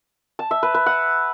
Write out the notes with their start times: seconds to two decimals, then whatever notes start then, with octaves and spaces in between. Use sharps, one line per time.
0.39 A5
0.51 E5
0.63 B4
0.75 B4
0.86 F#5